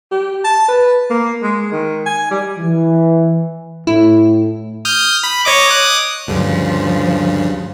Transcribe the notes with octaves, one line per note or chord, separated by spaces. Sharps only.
G4
A5
B4
A#3
G#3
D#3
G#5
G3
E3
A2 E4
D#6 F6 G6
B5
C#5 D#5 D6
D6 D#6 F#6
D2 G2 C#3 F3